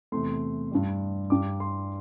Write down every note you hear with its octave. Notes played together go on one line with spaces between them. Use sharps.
E2 C3 A3 C6
G2 G3
G2 G3 D6
C6